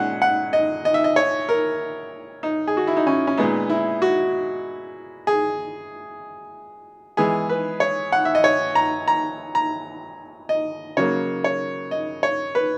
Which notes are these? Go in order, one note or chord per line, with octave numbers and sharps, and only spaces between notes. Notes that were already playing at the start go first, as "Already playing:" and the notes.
Already playing: A#2 G#3 C#4 F#5
F#5
D#5
D#5
E5
D#5
C#5
A#4
D#4
G#4
F#4
E4
D#4
C#4
C#4
A#2 G#3 B3 D#4
E4
F#4
G#4
E3 G#3 B3 G#4
B4
C#5
F#5
E5
D#5
C#5
A#5
A#5
A#5
D#5
C#3 F#3 A#3 C#5
C#5
D#5
C#5
B4